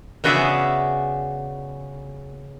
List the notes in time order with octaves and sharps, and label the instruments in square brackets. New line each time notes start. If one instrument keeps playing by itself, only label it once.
[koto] C#3 B3 F#4 G#4 D5 E5